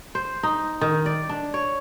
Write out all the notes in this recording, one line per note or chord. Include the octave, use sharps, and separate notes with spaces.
C5
D#4
D#3
D5
D4
C#5